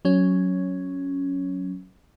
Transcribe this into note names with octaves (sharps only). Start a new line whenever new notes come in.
F#3 C#4